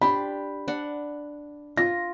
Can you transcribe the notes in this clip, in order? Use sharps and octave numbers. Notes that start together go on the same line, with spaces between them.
D4 G4 B5 C6
D4 F#5
F4 A#6